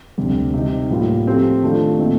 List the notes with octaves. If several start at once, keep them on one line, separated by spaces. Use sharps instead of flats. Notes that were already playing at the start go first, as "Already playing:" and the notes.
D2 C3 G3
C3 G3 C4 D#4
A2 G3 A#3 F4
F3 A3 C4 G4
D#3 A3 D4 F4
A#2 A3 C4 D#4